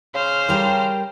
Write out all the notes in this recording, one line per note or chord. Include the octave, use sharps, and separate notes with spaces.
C#3 C5 F6
G3 A#4 G5